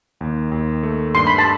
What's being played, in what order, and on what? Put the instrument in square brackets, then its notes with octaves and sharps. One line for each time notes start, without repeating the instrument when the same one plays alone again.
[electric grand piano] D#2
D#2
A3
[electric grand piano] G2 [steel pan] C6
[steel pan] B5
A5